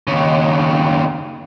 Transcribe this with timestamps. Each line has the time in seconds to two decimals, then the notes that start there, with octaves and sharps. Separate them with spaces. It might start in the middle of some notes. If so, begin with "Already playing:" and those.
0.07 D#2 C#3